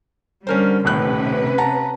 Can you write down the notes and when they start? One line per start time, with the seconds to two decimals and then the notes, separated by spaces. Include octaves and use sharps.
0.47 D3 G3 C#4 A#4 C5
0.85 D#1 A2 C3 C#4 B4 F#6
1.58 F#5 A5 A#5